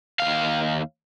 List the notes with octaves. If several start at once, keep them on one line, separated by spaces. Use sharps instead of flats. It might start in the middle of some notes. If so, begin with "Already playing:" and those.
D#2 F5